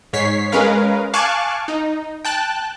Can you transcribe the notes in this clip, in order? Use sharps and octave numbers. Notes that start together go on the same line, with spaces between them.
G#2 C#5 B6 C7
G#3 C#4 A#4 B4 F5
F5 G#5 A5 C#6 D6 F#6
D#4
G5 A5 F#6